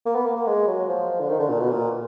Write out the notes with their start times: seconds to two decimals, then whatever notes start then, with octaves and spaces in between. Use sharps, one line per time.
0.06 A#3
0.15 B3
0.26 A#3
0.36 A#3
0.47 G#3
0.67 F#3
0.88 F3
1.20 D3
1.29 D#3
1.40 D3
1.49 A#2
1.60 B2
1.71 A#2